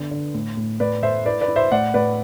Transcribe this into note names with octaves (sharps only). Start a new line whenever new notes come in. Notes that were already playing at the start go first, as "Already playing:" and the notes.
Already playing: D3 B3
D3
A2
A2
A2 B4 D5
A3 C5 E5
E4 B4 D5
B4 D5
E4
C5 E5
A2 D5 F#5
A2 B4 D5